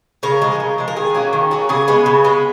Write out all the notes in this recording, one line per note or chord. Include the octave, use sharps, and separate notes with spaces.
C#3 A#4
F3 G#3
C#3
F3 G#3
A#4
D#3 G#4
F#3 A#3 C#4
D#3
F#3 A#3 C#4
C#3 G#4
G#3 B3
C#3
G#3 B3